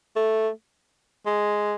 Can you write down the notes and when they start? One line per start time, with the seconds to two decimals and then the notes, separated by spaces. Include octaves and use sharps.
0.16 A3
1.26 G#3